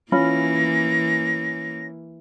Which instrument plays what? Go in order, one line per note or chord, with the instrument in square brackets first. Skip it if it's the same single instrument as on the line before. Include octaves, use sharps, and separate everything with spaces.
[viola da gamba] E3 A#3 [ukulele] C#4 F4 B5 [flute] A#6